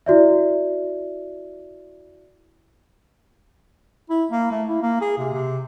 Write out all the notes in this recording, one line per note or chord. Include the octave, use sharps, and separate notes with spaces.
E4 F#4 D5 E5
E4
A#3
A3
E4
A#3
G#4
C3
C3